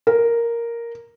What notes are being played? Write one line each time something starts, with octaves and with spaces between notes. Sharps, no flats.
A#4